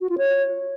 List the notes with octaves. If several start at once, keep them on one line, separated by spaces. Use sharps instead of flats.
F#4
F4
C#5